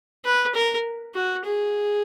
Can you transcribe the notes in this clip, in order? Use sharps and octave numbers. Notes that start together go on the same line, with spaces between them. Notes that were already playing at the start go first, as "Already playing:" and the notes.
B4
A#4
F#4
G#4